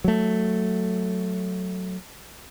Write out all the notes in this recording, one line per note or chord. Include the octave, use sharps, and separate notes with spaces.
F#3 A3